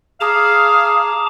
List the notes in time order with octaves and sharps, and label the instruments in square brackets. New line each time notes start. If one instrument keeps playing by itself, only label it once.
[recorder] G#4 [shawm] F5 [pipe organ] A5 A#5 D6